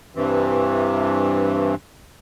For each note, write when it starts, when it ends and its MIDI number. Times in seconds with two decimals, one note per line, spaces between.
0.15 1.75 43
0.15 1.75 48
0.15 1.75 52